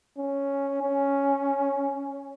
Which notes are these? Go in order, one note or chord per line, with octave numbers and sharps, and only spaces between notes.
C#4
C#4